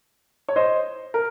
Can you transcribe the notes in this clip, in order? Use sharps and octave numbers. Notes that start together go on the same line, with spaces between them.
C#5
C5 D#5
A#4